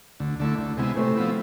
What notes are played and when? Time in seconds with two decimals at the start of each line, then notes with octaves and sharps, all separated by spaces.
0.20 D2
0.40 D3 A3 E4
0.58 D2
0.77 C3 G#3 B3 E4
0.96 C3 A3 C4
1.15 F3 B3 E4